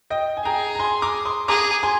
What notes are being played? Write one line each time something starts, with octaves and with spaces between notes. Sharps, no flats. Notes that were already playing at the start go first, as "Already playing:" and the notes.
D#5 G5
G#5
G#4 G5 A#5
A#5
G#5 C6
A#5 D6
C6 D#6
G#4 A#5 D6
G#5 C6